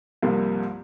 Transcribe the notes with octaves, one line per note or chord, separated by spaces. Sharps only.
C2 G2 C3 F3 A#3